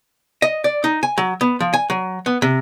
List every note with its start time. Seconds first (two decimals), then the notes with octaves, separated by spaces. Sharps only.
0.42 D#5
0.64 D5
0.84 D#4
1.03 G#5
1.18 F#3
1.41 B3
1.60 F3
1.74 G#5
1.90 F#3
2.26 B3
2.42 C3